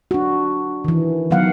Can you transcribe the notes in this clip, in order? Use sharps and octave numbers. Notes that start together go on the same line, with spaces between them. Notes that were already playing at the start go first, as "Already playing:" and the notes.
D4 F#4
D#3 E3
D#3 F#3 B3 F5 F#5